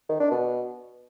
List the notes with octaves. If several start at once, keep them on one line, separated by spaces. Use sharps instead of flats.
D#3
D4
B2